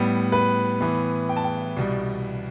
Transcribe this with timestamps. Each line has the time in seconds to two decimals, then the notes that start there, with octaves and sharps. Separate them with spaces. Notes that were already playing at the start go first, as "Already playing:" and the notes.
Already playing: A2 G3 B3
0.32 B4
0.80 A2 E3 B3
1.29 G5
1.36 A5
1.44 G5
1.77 C2 B2 G3